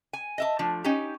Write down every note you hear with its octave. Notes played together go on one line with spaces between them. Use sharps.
G#5
D#5 E5 A5
F3 A3 D4
C#4 D#4 G4